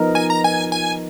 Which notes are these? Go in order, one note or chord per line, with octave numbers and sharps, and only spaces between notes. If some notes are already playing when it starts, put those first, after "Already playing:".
Already playing: F3 B3 D#4 A#4
G#5
A#5
G#5
G#5